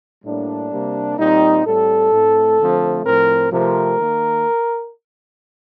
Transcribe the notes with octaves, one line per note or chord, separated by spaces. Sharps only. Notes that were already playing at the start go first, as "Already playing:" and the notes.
A2 G3 A#3 D4
C3 G3 A#3
A#2 G3 C4 D#4
A2 G3 C4 A4
A2 A3 C4
D3 F3 A3 C4
A2 F3 C4 A#4
C3 F3 A3 C4 A#4
D#3 A#3